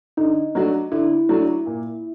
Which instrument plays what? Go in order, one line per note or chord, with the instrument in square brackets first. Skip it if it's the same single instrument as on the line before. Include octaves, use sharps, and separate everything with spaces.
[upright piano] D3 [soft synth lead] D#4
[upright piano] F#3 A3 D4 F#4
[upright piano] D3 [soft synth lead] E4
[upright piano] F#3 A3 D4 F#4
A#2